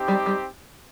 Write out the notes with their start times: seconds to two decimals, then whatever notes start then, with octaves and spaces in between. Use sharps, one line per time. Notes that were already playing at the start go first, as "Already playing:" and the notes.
Already playing: C4 D#4 G4
0.08 G3
0.26 G3